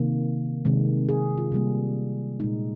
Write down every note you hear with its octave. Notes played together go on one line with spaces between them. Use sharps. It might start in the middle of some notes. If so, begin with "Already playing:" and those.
Already playing: C3 D#3 A#3
C3 D#3 G#3
G#4
F4
C3 G3 A#3
A#2 G#3 D#4